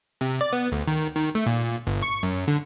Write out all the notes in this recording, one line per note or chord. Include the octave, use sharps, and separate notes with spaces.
C3
D5
B3
D2
D#3
D#3
A3
A#2
G1
C#6
F#2
D3